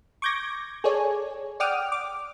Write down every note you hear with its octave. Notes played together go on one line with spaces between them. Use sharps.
C#6 D6 G6 G#6 A#6
G#4 A4 C#5 D5 G#5
D5 F#5 G5 D6 D#6 F6
D6